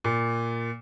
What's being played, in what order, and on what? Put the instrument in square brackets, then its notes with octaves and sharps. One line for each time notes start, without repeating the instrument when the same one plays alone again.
[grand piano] A#2